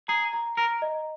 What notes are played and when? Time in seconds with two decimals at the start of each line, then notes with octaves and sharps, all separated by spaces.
0.08 G#4 A#5
0.33 A#5
0.57 A#4 A#5
0.82 D#5